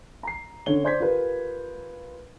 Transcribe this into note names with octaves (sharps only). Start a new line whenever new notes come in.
A#5 C7
D3 C#4 C#5 G7
C5 D5 C6 G6 G#6 B6
F4 G4 A#4 B4